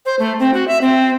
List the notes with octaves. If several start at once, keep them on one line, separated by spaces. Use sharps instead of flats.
C5
A3
C4
F#4
E5
C4